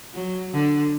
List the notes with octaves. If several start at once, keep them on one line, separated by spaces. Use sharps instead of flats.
F#3
D3